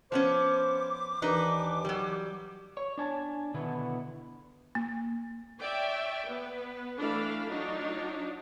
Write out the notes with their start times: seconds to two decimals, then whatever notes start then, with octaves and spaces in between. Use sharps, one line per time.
0.12 F3 B3 C#4 C5 D6
1.22 D#2 E3 D4 D#4 B4
1.85 F#3 G3
2.77 C#5
2.98 D4 G#5 A5
3.54 B2 D3 D#3 B3 E4
4.75 A#3
5.61 C#5 D5 E5 G5
6.25 B3 B4
6.98 E3 A3 D4 A4 F5 B5
7.48 F#3 D4 D#4 F4